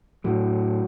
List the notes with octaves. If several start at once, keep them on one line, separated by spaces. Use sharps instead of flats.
A2 F#3